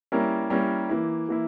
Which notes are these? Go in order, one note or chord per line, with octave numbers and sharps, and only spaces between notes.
G3 A#3 C#4 E4 A#4
G3 A#3 C#4 E4 A#4
E3 A#3 E4
E3 A#3 E4